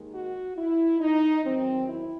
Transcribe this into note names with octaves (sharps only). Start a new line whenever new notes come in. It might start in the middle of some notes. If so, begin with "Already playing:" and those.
Already playing: D#2 D#3 G#3
F#4
E4
D#4
E2 D#3 F#3 C4
E4